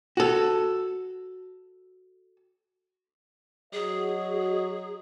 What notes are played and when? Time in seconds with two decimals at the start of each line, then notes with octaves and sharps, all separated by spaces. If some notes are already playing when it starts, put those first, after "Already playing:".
0.17 F#4 A4
3.73 F#3 F#4 G#4 D#5